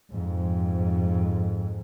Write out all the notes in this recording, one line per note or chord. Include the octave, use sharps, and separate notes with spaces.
F2 G#2